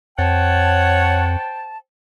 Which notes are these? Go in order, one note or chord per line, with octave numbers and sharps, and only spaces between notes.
F2 C5 C#5 F#5 G5 A5